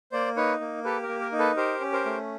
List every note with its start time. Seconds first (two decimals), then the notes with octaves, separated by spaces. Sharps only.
0.12 A#3 C5 D5
0.36 D#4 B4 C#5
0.60 A#3
0.84 G4 A4 B4
1.03 A#4
1.08 A#3
1.21 A#4
1.32 D#4
1.39 A4 B4
1.57 G4 A#4 C5
1.81 C#4
1.92 A#4 C5
2.05 A3